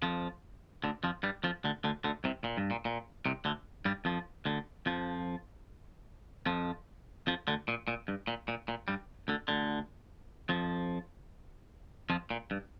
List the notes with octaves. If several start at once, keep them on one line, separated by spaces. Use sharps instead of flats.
F2 F3
D2 D3
F2 F3
G2 G3
F2 F3
D2 D3
D2 D3
D2 D3
C2 C3
A#2
G2
A#2
A#2
C2 C3
D2 D3
G2 G3
F2 F3
D2 D3
F2 F3
F2 F3
F2 F3
D2 D3
A#2
A#2
G2
A#2
A#2
A#2
G2 G3
D2 D3
D2 D3
F2 F3
F2 F3
A#2
G2